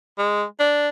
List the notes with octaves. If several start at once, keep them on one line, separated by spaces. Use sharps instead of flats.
G#3
D4